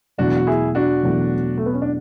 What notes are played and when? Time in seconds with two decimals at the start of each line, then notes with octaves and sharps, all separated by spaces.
0.18 E2 B2 F#3 A3 D4 F#4
0.37 F#4
0.47 E4 G#4
0.75 D4 F#4
1.03 E2 B2 F#3 A3
1.58 A3
1.66 B3
1.73 C#4
1.82 D4